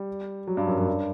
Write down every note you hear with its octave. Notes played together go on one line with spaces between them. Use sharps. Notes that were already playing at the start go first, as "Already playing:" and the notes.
Already playing: G3
F#3
G2
F#2
F#2
G2